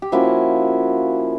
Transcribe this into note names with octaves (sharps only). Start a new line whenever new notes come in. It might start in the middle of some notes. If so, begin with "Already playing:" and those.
G4
F3 A#3 C#4 E4 F#4